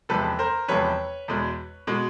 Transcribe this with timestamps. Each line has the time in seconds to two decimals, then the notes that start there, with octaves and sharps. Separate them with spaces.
0.09 E2 C3 F3 G#3 A4 B4
0.39 A#4 C5
0.68 E2 C3 F3 G#3 B4 C#5
1.28 E2 B2 G#3
1.87 B2 G#3